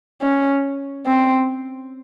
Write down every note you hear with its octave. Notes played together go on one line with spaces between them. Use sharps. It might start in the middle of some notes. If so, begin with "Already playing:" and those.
C#4
C4